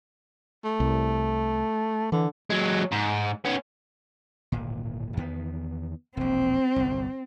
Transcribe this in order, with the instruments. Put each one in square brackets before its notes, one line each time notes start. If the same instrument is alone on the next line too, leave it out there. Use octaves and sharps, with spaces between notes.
[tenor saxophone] A3
[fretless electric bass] C2
[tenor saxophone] D3 [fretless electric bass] E3
[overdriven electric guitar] F#3 G#3
G#2
B3 C#4
[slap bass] D1 G#1 A#2
E2 D#3 B3
[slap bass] E1 A#1 [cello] C4
[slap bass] G1 C2